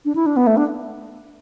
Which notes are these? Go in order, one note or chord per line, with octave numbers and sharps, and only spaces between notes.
D4
E4
D4
B3
A3
D4